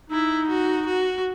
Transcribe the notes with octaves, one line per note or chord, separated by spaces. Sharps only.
D#4 E4
F#4
F#4